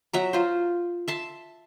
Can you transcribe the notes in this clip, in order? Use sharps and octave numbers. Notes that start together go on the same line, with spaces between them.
F#3 E5 A#5
F4 C5
E5 A5 C6